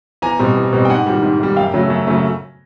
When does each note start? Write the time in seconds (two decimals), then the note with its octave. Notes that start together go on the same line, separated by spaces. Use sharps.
0.22 E2 G#5 A#5
0.39 B2 G3 C4
0.56 E2
0.73 B2 G3 C4
0.85 G5
0.90 G#2 F#5 G#5
1.06 D#3 G3
1.23 G#2
1.40 D#3 G3
1.56 F#2 F5 G5
1.73 C#3 F#3 A3 C#4
1.90 F#2
2.07 C#3 F#3 A3 C#4